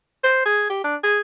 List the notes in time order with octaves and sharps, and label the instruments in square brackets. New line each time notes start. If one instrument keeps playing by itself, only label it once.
[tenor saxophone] C5
G#4
G4
D4
G#4